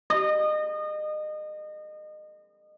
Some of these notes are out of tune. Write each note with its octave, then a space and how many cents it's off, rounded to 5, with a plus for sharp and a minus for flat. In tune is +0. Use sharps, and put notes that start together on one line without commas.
D#5 -30